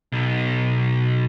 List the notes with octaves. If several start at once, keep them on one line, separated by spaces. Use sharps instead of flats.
B1